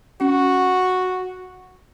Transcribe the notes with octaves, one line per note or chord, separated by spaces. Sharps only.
C#4 F#4